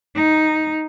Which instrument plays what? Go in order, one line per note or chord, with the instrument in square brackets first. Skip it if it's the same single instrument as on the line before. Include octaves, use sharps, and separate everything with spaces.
[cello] D#4